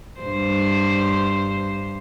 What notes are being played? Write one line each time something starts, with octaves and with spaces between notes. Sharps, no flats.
G2 C5